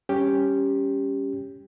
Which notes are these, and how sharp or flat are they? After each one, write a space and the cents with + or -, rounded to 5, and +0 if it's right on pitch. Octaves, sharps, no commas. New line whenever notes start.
G3 +0 C#4 +0 G4 +0